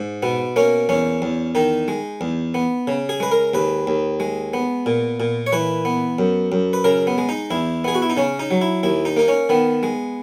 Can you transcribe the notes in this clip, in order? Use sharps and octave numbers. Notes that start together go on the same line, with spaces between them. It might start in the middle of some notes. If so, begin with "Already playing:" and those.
Already playing: G#2
B2 B3
A#3 C#4
E2 C#4
E2
D#3 D#4
G#3
E2
B3
C#3
G#4
G#3 B4
A#4
D#2 B4
D#2
G#3
B3
A#2
A#2
C#5
E3 B4
B3
F#2
F#2
B4
C#3 A#4
B3
G#3
D#4
E2 E4
B3 G#4
F#4
E4
D#4
C#3 C#4
D#4
F#3
E4
D#2 E4
D#4
A#3 D#4
C#4
D#3 B3
G#3